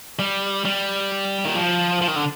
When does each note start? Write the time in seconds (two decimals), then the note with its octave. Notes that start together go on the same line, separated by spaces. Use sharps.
0.19 G3
0.65 G3
1.45 D#3
1.55 F3
2.02 F3
2.08 D#3
2.16 D3